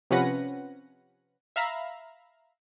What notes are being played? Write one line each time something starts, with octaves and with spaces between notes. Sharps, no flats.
C3 F3 C#4 B4 F#5 A#6
E5 F5 A#5 B5